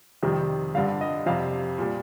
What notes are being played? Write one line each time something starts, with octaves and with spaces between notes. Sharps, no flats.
F2 C3 D#3 G3
G2 D3 G3 F5
D#5
F2 C3 G3 F5
A#2 G3